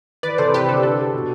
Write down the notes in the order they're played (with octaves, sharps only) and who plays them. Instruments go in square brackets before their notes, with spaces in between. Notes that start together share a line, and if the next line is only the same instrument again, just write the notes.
[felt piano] E3 [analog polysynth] B4 D5
[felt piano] C3 [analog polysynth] A4 C5
[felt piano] E4 [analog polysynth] G4 B4
[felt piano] D3 [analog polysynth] A4
[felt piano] D4 [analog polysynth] A4
[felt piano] G4
B2